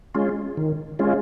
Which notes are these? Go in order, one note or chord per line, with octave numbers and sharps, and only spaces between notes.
G#3 C#4 F4
D#3
G#3 C#4 F4